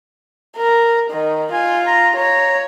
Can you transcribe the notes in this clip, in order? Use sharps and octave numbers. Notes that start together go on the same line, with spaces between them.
A#4
D#3
F4 G#5
A#5
C#5 A#5